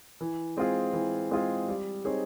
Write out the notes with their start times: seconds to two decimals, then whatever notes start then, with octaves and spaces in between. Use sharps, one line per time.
0.21 E3
0.57 G#3 C4 F4 G#4
0.93 E3
1.31 G#3 C4 F4 G#4
1.68 G3
2.04 C4 D#4 G#4 C#5